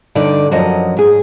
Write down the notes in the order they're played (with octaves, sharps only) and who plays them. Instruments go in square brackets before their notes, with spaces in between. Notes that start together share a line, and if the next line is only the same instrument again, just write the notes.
[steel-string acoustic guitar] G2 D3 D#4 D5
F#2 F3 F#3 D#5
G#2 G#4